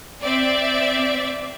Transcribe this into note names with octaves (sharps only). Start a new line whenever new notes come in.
C4 D5 E5